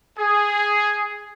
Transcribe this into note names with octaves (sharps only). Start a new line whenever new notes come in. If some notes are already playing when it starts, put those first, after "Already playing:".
G#4